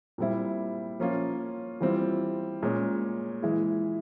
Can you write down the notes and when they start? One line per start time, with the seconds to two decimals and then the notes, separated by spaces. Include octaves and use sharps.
0.18 A#2 G3 C4 E4
1.00 F3 A#3 C#4 F4
1.81 E3 G3 C4 F4
2.63 A#2 G#3 C#4
3.43 E3 G#3 E4